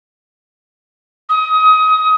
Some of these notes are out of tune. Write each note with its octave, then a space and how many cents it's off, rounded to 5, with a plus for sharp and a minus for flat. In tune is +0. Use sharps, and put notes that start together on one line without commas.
D#6 +25